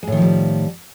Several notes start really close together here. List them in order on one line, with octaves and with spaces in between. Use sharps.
G#3 A2 D#3 F3 G3